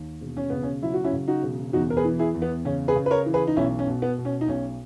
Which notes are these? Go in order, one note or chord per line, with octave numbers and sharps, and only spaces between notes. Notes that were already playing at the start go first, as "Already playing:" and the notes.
Already playing: D#2
E1
C#4
C#3 B3
C#4
F#3 E4
F#4
C#4 E4
C#3
D#4 F#4
E1
E2 D#4 F#4
A#4
G#4 B4
E3
E4 G#4
E2
B3
C#3 C#4
G#4 B4
C#3
B4
A#4 C#5
E3
G#4 B4
D#4
B1 C#4 E4
C#4
B2
B3
B2
C#4
D#4
B1 C#4